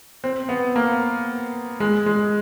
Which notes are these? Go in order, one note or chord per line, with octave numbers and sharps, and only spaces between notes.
C4
B3
A#3
G#3
G#3